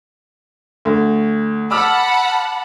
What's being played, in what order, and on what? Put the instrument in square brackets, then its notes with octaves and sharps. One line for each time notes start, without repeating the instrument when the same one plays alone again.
[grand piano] D2
[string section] F#5 A5 B5 [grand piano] D6 E6 F6